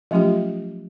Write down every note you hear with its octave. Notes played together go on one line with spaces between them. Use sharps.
F3 F#3 A3 C#4 F4 G4